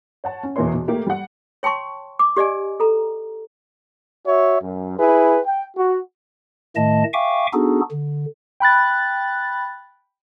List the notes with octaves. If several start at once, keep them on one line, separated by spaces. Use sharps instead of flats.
C#5 F#5 A5
C#4
E2 B2 E3 A#3 C#5 C6
B2
A3 A#3 G4 A4
G3 F#5
C#5 G5 A5 C6 C#6
D6
G4 D5 D#5 G#5
A4 A#5
F#4 C#5 E5
F#2
E4 G#4 B4
G5
F#4
A2 D#3 A3 D#5 A5
E5 F5 G5 G#5 C#6 D6
B3 D4 D#4 F#4 G#4 A4
D3
G5 B5 F#6 A6